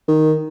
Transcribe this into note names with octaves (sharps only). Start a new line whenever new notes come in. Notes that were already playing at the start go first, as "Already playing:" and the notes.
D#3